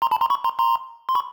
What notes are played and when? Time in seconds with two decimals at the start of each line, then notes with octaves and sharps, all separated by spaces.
0.02 A#5 C6
0.11 A5 B5
0.21 A#5 C6
0.30 B5 C#6
0.44 A#5 C6
0.59 A#5 C6
1.09 C6
1.15 B5 C#6